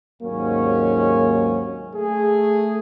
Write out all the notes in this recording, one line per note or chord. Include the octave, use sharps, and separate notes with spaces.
D#2 G#2 C3 F#3 A#3 C#4
A3 G#4